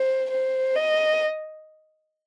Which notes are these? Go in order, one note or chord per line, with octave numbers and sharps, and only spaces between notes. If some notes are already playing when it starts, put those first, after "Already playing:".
Already playing: C5
C5
D#5